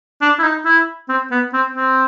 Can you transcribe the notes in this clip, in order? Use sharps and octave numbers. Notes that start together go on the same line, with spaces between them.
D4
E4
D#4
E4
C4
B3
C4
C4